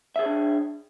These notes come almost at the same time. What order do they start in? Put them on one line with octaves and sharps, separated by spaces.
E5 G#4 C#5 D4